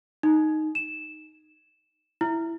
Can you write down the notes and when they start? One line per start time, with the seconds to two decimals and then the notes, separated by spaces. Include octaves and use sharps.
0.23 D#4
0.75 E7
2.21 E4